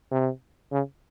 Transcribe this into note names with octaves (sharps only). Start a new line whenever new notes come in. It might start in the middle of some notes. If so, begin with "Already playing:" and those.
C3
C#3